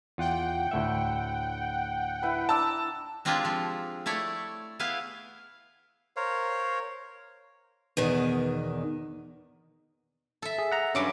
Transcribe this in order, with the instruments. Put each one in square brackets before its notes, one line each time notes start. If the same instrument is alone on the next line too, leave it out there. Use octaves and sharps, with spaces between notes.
[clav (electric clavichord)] E2 F4 [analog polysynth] F#5 G5
[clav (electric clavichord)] D2 A2 E5
[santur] E4 B4
[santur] D4 A#5 [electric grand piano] A5 E6
[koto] G#3 C4 D4 F4 G4 G#4
F3
A3 E4 C#5 D5
B3 E4 G#4 F5
[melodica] A#4 C5 C#5 F5
[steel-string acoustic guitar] E2 B2 D#3
[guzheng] A4 E5
[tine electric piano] G#4
F#5 A#5
[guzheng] G2 F#3 F#5 [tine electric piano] C#4 D6